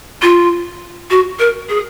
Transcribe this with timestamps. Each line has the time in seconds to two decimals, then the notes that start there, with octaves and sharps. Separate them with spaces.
0.22 F4
1.10 F#4
1.39 A#4
1.69 G#4